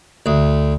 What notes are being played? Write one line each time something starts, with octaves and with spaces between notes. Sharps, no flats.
D2